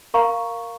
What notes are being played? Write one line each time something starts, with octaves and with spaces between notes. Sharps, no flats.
A#4 F5 A#5 C#6